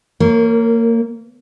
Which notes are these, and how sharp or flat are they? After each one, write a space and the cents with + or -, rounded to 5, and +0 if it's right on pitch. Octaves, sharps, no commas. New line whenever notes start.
A#3 -25 A#4 +0 C#5 +0